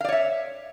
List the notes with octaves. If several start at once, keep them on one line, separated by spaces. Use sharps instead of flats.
C#5 D5 E5 F5